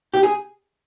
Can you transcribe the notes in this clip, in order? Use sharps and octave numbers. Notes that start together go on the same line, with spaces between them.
G4
G#4